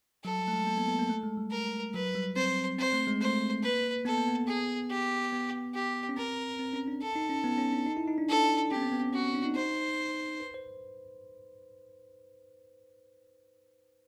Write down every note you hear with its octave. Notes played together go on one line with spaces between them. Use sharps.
F#3 A4
G3
A3
G#3
A#3
B3
B3
A#3
A3
G#3
G3
A#4
F#3 B4
G3
C4 C5
C4 C5
A3
G#3
A3 C5
A#3 B4
B3 A4
A#3
B3
G#4
G4
B3
G4
C#4
C4 A#4
C4
C#4
D4
A4
D#4
C#4
B3
C#4
D4
D#4
E4
D#4
D4
D4 A4
C#4 G4
B3
C4
B3
C#4
C#4 F#4
C#4
D4
D#4
D#4 C5
B4
C5